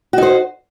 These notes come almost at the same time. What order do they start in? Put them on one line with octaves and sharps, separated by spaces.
F#4 D#4 C5